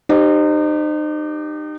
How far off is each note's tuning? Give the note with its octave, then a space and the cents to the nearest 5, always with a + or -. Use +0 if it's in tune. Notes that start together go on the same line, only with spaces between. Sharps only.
D#4 -35 G4 +0 C5 +0